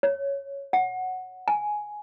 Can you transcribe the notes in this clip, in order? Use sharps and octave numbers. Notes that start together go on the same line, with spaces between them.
C#5
F#5
G#5